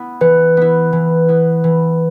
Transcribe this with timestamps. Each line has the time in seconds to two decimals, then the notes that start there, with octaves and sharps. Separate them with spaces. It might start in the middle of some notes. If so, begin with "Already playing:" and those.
Already playing: B3 E4
0.21 E3 B4
0.57 B3 E4
0.93 E3
1.28 B3 E4
1.64 E3